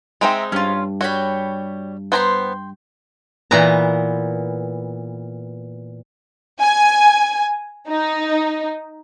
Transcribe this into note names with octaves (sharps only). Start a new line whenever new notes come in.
G#3 C4 D#4 E5 G5 A#5
G2 C#4 F4
G3 F#4 C#5 G5 B5
B3 C5 G5 G#5 A#5 C6
A#2 E3 B3 A#5
G#5
D#4